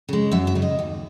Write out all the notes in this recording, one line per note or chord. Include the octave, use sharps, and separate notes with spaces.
C#3 G#3
F#2 E5
E5
C#3 G#3
D#5
D#2